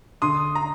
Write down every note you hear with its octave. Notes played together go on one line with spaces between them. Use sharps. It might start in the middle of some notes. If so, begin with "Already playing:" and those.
D3 C6 D#6
A#5